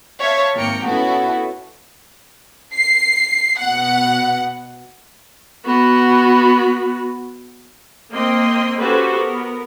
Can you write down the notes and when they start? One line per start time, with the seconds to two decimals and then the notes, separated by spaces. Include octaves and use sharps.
0.20 C#5 E5 F5 A5
0.55 G#1 A#3 G5 A#5 C#7
0.86 B3 C#4 E4 F#4 A4
2.74 C7
3.59 B2 F#5
5.66 B3 F#4
8.11 A#3 C4 D#5 G5 C6
8.79 C#4 F#4 G4 A4 B4 C5
9.14 B3 A#4